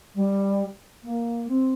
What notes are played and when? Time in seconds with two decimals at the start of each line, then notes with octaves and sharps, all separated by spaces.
0.15 G3
1.04 A#3
1.48 C4